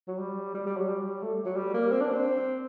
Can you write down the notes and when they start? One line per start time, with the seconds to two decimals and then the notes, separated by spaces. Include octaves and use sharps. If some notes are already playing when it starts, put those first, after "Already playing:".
0.08 F#3
0.19 G3
0.55 G3
0.66 G3
0.77 F#3
0.89 G3
1.23 A3
1.46 F#3
1.57 G3
1.74 A#3
1.92 C4
2.01 D4
2.10 C4